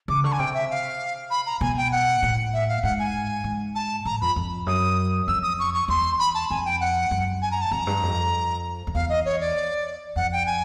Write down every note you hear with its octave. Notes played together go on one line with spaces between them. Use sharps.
C#3 D6
D3 C#6
G#5
C3 G5
E5
F5
B5
A#5
B2 G#5
G5
F#5
A2
E5
F5
G#2 F#5
G#5
G#2
A5
A2 A#5
F2 B5
F2
F#2 D#6
F2 E6
D#6
C#6
C#6
E2 C6
B5
A5
F2 G#5
G5
F#5
F#2
G#5
A#5
A5
F2 A#5
G2
F2
F2
E2 F5
D#5
C#5
D5
F2 F#5
G5
G#5